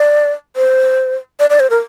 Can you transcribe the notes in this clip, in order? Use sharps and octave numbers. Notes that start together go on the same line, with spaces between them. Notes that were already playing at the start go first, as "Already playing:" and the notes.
Already playing: D5
C5
D5
D5
C5
A#4